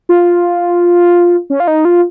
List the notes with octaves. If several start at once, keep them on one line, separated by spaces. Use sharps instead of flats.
F4
C#4
F4
D#4
F4